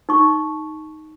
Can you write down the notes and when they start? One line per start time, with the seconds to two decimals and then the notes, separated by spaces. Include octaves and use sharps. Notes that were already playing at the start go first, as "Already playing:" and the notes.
0.09 D#4 C#6